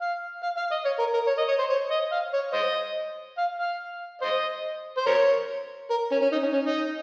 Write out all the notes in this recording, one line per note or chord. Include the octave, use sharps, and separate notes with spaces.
F5
F5
F5
D#5
C#5
A#4
A#4
C#5
D#5
C#5
C5
C#5
D#5
F5
C#5
C5 D#5
F5
F5
C5 D#5
C5
A#4 C#5
A#4
C#4
C#4
D#4
C#4
C#4
D#4